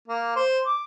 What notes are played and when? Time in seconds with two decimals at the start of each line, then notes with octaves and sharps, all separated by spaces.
0.08 A#3
0.36 C5
0.66 D6